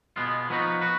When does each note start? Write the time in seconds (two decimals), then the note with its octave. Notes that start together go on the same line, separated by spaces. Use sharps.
0.16 B2 G#3 B3 F4
0.50 F3 B3 D#4 F#4 B4
0.81 F#4 B4